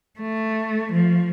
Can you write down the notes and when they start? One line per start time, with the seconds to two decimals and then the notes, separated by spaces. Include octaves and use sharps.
0.20 A3
0.93 F3